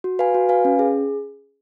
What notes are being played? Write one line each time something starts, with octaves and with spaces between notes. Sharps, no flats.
F#4
B4 F5 G#5
F#4
B4 F5 G#5
C#4
G#4